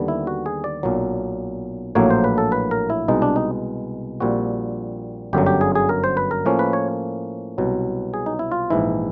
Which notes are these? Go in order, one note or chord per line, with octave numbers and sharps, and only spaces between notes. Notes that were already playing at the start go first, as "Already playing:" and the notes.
Already playing: D#2 D3 G3 B3
E4
F#4
G#4
D5
B1 A#2 F#3
A#1 A2 F#3 A#3 C#5
C5
B4
A4
B4
A#4
E4
C2 B2 G#3 D#4
D4
D#4
A#1 A#2 G3 C4 F#4
G1 F#2 D3 F#3 G4
G4
G#4
G#4
A#4
C5
B4
A#4
A2 F3 A#3 C#4
B4
C#5
C2 B2 F#3
G#4
D#4
E4
F4
A#1 G#2 E3 E4